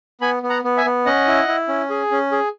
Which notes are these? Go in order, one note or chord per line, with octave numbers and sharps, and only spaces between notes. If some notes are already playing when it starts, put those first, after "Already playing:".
B3 G#5 B5
B3
F#5 A#5
B3
E5 G#5
B3
C#4 D#5 F#5
E4
E4
C#4
G#4
C#4
G#4